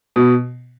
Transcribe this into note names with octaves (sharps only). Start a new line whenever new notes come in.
B2